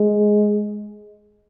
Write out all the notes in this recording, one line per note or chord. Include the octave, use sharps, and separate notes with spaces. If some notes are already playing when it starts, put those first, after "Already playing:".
Already playing: G#3